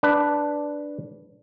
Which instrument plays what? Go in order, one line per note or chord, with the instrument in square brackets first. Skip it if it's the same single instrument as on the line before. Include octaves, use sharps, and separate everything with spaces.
[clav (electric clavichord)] D4 B4